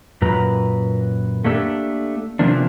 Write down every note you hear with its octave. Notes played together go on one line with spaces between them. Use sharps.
F#2 A#2 B4 A#5
A3 A#3 D4 G4 A4
C3 E3 F3 A#3 D4